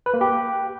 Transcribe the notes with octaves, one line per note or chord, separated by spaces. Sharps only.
B4
A#3
G4